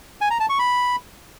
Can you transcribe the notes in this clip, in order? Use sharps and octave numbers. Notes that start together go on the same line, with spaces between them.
G#5
A#5
A5
C#6
B5